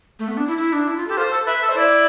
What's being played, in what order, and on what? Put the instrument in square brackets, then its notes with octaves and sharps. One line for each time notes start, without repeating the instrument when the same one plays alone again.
[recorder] A3
B3
D4
E4
E4
D4
E4
F4
[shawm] G4 [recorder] A4
[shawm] F4 [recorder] C5
[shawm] A4
[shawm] B4 [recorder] E5
[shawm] A4
[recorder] C5
[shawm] E4 [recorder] D5